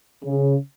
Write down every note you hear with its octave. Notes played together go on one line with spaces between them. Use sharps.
C#3